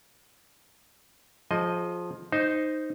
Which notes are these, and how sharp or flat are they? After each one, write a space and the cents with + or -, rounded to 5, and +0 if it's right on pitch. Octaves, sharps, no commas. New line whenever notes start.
F3 +10 G#4 +35 D#5 +0
D#4 +0 C5 +0